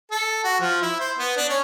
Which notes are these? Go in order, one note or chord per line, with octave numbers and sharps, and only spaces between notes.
A4
F#4
F3
E4
C5
B3
D4
C#4